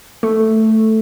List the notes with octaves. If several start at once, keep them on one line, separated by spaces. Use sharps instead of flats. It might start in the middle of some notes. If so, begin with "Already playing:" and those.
A3